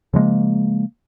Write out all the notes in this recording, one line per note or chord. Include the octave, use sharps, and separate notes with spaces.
C#3 F3 G#3 A#3